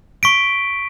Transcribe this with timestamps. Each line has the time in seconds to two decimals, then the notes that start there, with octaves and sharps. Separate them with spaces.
0.23 C#6 B6 D7